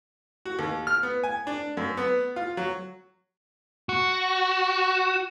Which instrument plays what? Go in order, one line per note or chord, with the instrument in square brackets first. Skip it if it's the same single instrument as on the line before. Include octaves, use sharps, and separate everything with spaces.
[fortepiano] F#4
D#2
F6
B3
G#5
D4
F#2
B3
F4
F#3
[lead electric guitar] F#4